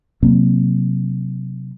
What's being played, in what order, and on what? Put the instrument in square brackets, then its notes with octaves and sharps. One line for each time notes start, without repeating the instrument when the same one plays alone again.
[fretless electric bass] C3 F#3 A#3 C4